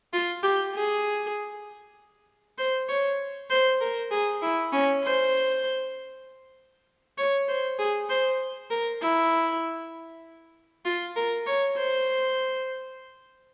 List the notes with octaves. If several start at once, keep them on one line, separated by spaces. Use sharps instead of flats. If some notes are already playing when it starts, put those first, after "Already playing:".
F4
G4
G#4
C5
C#5
C5
A#4
G#4
E4
C#4
C5
C#5
C5
G#4
C5
A#4
E4
F4
A#4
C#5
C5